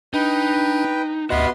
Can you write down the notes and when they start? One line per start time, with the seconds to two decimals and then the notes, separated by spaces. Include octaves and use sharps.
0.14 D4 D#4 B4 G5
1.30 D2 B3 F#4 G4 B4 D#5 E5 C6